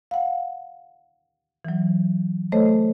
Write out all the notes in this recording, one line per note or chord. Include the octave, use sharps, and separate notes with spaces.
F5 F#5
E3 F#3
A3 A4 C5 C#5 D#5